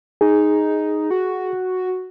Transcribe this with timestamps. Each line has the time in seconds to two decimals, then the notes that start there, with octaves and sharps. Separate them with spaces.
0.21 D#4 G#4
1.11 F#4